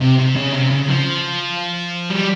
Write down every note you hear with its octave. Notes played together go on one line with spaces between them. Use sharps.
C3
C3
C#3
C3
C#3
F3
G3